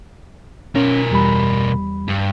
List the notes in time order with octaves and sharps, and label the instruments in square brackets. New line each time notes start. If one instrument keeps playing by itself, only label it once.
[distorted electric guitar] B2 A#4 [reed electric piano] C#4
[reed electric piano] E2 G3 B5
[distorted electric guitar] G2